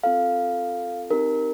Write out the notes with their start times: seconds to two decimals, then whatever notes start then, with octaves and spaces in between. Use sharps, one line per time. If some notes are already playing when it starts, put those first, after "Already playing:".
0.03 C4 F4 A4 F5
1.10 C4 D#4 G4 A#4